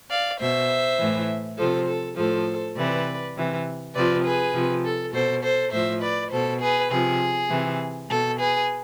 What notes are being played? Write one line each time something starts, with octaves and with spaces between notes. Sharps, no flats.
D5 F5
B2 C5 E5
A2 E3
C3 F3 A4 C5
A4
A2 F3 A4 C5
C3 E3 B4 D5
C3 E3
C3 F3 B4 D5
G#4 B4
C3 F3
A4
B2 A4 C5
A4 C5
A2 F3 C5 E5
B4 D5
B2 A4 C5
G#4 B4
C3 F3 G#4
C3 E3
B2 A4
G#4 B4